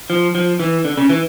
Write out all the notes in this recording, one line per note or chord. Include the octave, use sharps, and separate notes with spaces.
F3
F3
E3
D3
C#3
E3